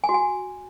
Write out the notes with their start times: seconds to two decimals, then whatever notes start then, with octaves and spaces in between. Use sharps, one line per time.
0.04 G#5
0.09 F#4
0.14 G#5